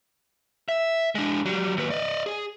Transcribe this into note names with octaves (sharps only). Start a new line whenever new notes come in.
E5
G#3 D4
F#3 G3
D#2 B4
D5 D#5
G#4